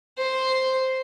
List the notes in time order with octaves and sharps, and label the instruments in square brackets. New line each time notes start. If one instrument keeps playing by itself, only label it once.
[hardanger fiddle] C5